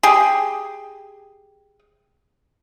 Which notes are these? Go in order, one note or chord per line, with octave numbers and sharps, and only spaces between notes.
G4 G#4